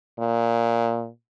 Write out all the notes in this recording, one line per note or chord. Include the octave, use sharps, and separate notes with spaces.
A#2